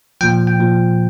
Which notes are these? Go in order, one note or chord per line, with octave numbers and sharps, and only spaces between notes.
A#2 F3 G5
G5
A#2 F3